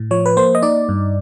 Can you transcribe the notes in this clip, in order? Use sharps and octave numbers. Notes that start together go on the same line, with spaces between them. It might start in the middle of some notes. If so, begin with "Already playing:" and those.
Already playing: A2
F3 C#5
B4
A#3 C5
D#5
D#4 D5
G2